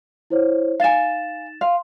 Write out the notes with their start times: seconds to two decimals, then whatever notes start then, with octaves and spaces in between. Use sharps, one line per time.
0.30 E4 C5 C#5
0.80 D#4 F5 G#5 A6 E7
1.61 F5 C6